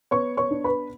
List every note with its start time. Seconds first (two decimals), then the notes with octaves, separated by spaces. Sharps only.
0.11 B3 C#5 C#6
0.37 C#5 C#6
0.51 D4
0.64 B4 B5